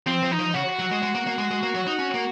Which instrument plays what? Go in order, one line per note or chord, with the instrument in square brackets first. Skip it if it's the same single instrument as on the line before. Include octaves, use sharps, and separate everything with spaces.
[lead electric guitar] F3 [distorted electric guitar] C4
[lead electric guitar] F3
[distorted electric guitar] D#4
[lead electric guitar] F3
[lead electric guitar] C#3 [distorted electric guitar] F#4
[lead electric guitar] F#3
G#3
G#3
A#3
A#3
G#3
G#3
A#3
F#3
D#4
C#4
A#3